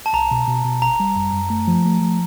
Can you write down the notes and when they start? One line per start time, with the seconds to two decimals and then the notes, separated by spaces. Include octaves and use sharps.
0.06 A5
0.13 C2 A#5
0.31 B2
0.47 B2
0.65 B2
0.82 G1 A#5
1.00 G3
1.16 F#2
1.33 F#2
1.50 A3
1.68 F3
1.85 A3
2.01 F3